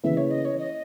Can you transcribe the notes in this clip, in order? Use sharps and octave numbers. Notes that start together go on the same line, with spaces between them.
C#3 E3 A#3 E4 B4 E5
C#5
D#5
C#5
D#5